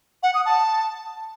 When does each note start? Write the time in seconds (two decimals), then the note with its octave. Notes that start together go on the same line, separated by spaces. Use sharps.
0.23 F#5
0.34 D#6
0.46 A5